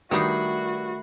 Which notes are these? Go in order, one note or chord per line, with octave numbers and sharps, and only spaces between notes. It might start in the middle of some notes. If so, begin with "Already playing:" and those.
G2 D#3 G3 A3 D#4 F#4 B5 C7